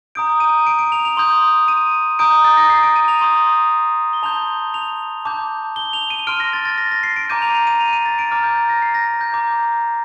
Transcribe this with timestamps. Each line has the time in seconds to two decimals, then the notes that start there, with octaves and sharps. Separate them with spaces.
0.15 A#5 D#6 G6 D7
0.40 D#7
0.67 D7
0.79 D7
0.92 F7
1.05 F7
1.17 C6 D#6 G6
1.68 D#7
2.19 A#5 D#6 G6 D7
2.45 A6
2.57 A#6
2.70 C7
2.83 D7
2.96 D#7
3.08 F7
3.21 C6 D#6 G6
4.13 G7
4.23 A5 C6 G6 F7
4.74 F7
5.25 A5 D6 G6
5.76 G7
5.93 F7
6.10 D#7
6.27 C6 F6 D7
6.40 A#6
6.53 A6
6.65 A6
6.78 A#6
6.91 A#6
7.03 C7
7.16 D7
7.29 A#5 D6 G6 D#7
7.42 F7
7.55 F7
7.67 D#7
7.81 F7
7.93 D#7
8.06 A6
8.19 D7
8.31 A#5 D6 F6 A6
8.44 G6
8.57 A6
8.69 A#6
8.82 C7
8.94 A#6
9.21 G6
9.33 A#5 D6 G6